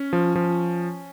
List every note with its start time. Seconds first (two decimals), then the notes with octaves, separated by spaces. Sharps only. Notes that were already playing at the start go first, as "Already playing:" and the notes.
Already playing: C#4
0.13 F3
0.35 F3